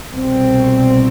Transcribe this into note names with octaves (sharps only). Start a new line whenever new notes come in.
C2 B2 C4